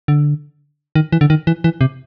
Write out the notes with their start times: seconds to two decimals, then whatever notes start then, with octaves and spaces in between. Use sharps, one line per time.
0.08 D3
0.95 D#3
1.12 E3
1.21 D3
1.30 D#3
1.47 E3
1.64 E3
1.81 C3